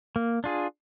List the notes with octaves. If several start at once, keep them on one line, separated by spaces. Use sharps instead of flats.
A#3
D4 F4 G#4